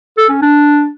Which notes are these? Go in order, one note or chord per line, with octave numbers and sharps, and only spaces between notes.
A4
C#4
D4